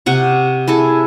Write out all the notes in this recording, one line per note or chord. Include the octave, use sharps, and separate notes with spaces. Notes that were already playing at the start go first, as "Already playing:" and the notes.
C3 F#5 C#6
E4 G#4 A4 A5